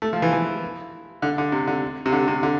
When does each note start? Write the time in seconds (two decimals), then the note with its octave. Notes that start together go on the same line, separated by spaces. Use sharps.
0.02 A3
0.13 F3
0.22 E3
0.33 E3
1.22 D3
1.38 D3
1.52 C3
1.67 D3
2.06 C3
2.12 D3
2.28 C3
2.43 D3